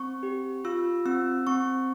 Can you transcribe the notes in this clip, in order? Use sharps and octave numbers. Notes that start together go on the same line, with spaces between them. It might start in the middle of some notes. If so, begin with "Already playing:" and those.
Already playing: C4 C#6
G4
F4 E6
C4 E6
C4 C#6